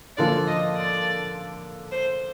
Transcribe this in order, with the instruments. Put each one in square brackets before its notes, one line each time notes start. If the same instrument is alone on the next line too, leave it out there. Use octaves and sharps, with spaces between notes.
[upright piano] D3 F3 A#3 F4 [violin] D5
[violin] D#5
D5
C5